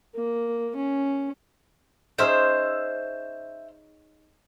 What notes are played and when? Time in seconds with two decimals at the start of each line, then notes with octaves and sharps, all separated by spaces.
0.15 A#3
0.75 C#4
2.18 C#4 D#4 G#4 C5 E5 F6